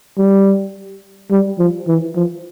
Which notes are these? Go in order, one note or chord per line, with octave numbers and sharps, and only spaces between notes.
G3
G3
F3
E3
F3